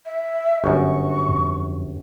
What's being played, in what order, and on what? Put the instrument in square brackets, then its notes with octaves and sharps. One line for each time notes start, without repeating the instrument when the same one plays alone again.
[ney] E5
[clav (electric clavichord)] G1 F#2 [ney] C#6
[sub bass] F2